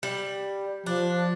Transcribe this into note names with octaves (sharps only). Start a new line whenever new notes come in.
G3
F3 D4